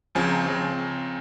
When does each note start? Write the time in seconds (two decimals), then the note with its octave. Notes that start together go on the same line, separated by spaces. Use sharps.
0.15 C#2 C#3 F3 C4 G#5
0.31 A#5
0.46 C#3 F3 C4